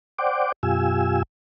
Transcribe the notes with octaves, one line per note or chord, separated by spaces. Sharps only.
C5 D5 F#5 G5 D6
F#2 B2 F4 G4 G#5 E6